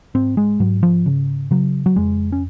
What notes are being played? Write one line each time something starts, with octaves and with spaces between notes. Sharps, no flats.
G#2 C4
G#3
G#2 F#3
F3
C#3
C#3 F#3
F#3
F2 G#3
C#4